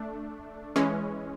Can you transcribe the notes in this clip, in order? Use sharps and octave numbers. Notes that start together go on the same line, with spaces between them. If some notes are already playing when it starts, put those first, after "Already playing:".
Already playing: A3 D4
E3 G#3 C#4